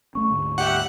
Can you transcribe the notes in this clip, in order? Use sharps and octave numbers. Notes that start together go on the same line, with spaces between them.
A3 C#4 C#6
D2 G#2 D3
G3 G4 E5 F#5